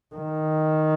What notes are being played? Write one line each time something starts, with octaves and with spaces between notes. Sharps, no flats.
D#3